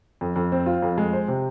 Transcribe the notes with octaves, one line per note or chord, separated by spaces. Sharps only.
F2
F2
C4
F4
F2
G#3
C5
C3